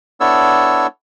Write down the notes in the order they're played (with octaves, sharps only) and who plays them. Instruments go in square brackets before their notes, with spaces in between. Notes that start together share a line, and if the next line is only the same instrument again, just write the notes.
[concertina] B3 D4 E4 A4 C#5 E6